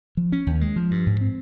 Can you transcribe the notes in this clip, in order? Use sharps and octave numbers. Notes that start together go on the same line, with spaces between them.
F3
C#4
D#2
G#3
F3
G2
G#2
C4